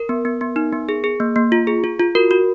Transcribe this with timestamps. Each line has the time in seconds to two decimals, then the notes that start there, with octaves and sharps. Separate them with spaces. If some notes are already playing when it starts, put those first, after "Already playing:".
Already playing: A#4
0.09 B3
0.25 B3
0.41 B3
0.56 D#4
0.73 B3
0.89 G#4
1.04 G#4
1.20 A#3
1.36 A#3
1.52 F4
1.67 G#4
1.84 F4
2.00 F4
2.15 F#4 A#4
2.31 F#4